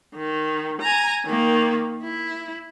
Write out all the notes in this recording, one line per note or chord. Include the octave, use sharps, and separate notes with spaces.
D#3
G#5 A#5
D#3 A#3
E4